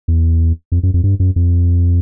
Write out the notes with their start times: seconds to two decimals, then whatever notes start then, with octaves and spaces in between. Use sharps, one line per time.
0.08 E2
0.72 F2
0.83 F#2
0.94 F2
1.04 G2
1.20 F#2
1.36 F2